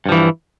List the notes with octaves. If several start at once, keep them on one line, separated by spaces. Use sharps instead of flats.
G2 E3 F3